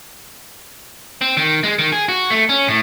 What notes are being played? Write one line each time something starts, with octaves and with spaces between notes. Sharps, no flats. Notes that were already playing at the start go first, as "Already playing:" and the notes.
C4
D#3
G#3
D#3
G#4
F#4
A3
C#4
A2